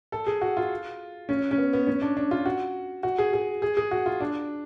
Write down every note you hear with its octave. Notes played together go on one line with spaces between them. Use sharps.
A4
G#4
F#4
F4
C#4
C#4
B3
B3
C#4
D4
D4
F4
F#4
F#4
G#4
G#4
G#4
G#4
F#4
F4
D4